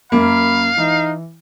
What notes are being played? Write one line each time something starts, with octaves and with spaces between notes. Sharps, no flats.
F#2 A#3 F5 B5
E3 D#4